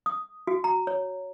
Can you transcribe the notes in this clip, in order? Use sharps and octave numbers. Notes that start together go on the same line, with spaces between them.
D#6
F#4
A#5
C#5